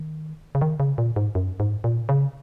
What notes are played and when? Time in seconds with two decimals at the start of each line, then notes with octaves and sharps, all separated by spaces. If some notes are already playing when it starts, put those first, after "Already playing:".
Already playing: D#3
0.55 C#3
0.61 D#3
0.80 C#3
0.98 A#2
1.16 G#2
1.35 F#2
1.60 G#2
1.84 A#2
2.09 C#3